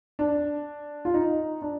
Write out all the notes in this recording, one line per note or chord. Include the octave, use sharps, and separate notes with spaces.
D4
F4
D#4
D4